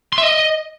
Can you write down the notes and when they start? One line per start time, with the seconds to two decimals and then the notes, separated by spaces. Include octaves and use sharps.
0.13 C6
0.18 E5
0.23 D#5